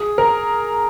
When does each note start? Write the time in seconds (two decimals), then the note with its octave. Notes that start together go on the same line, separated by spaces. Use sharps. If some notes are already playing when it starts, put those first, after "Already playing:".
Already playing: G#4
0.18 A#4